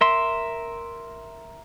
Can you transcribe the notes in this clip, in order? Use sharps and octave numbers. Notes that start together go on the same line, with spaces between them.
A#4 E5 C6